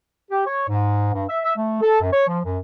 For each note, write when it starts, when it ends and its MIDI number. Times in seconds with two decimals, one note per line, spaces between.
0.31 0.45 67
0.46 0.64 73
0.69 1.11 44
1.14 1.23 43
1.29 1.38 76
1.44 1.52 76
1.56 1.81 57
1.81 1.98 69
2.01 2.09 42
2.12 2.26 73
2.27 2.39 53
2.44 2.57 42